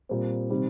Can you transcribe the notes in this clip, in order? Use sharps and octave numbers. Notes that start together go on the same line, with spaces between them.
A#2 G3 C4
C3 D#3 G3 C4